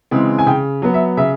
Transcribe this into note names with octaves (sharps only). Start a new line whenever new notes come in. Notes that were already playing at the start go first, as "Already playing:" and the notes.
C#3 E3 G#3 C4
G#5
C#3 G5
F#3 B3
E5
C#3 E5